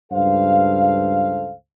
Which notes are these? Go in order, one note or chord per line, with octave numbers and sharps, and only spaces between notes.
C#2 G2 A4 C5 F5